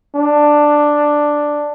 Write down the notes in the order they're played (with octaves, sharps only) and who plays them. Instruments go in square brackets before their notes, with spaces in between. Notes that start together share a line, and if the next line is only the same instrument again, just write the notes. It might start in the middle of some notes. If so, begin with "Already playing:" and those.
[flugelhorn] D4